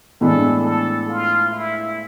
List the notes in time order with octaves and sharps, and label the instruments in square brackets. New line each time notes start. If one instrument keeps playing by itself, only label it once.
[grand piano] A2 E3 G#3 B3 D4 [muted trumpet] A4
[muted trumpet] A4
F4
E4